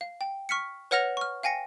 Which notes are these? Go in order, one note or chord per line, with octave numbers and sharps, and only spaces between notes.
F5
G5
C#6 F6 B6 C#7
B4 C#5 F#5 F6 A#6 F7
C#6 F6
F5 G5 G#5 A#6 C#7